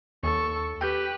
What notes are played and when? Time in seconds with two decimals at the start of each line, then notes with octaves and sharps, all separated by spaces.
0.23 D#2 A4 C#6
0.81 G4 B4 G5 G6